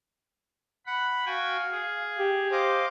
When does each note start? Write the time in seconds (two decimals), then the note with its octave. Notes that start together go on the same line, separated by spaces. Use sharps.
0.86 F#5 B5
1.26 F#4 F5 G5 G#5
1.71 G#4
2.19 G4
2.51 C5 D#5 F5 D6